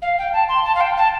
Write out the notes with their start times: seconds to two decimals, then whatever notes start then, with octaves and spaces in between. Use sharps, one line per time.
0.02 F5
0.18 G5
0.33 A5
0.49 C6
0.65 A5
0.75 F5
0.81 G5
0.97 A5